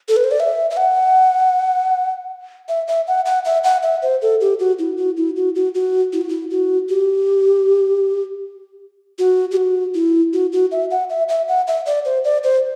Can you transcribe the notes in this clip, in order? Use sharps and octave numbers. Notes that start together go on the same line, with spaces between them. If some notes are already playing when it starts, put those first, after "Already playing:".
A4
B4
C5
D5
E5
E5
F#5
E5
E5
F#5
F#5
E5
F#5
E5
C5
A4
G4
F#4
E4
F#4
E4
F#4
F#4
F#4
E4
F#4
E4
F#4
G4
F#4
G4
F#4
E4
F#4
F#4
E5
F#5
E5
E5
F#5
E5
D5
C5
D5
C5